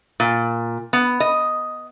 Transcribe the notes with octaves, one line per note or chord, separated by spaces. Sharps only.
A#2
B3
D#5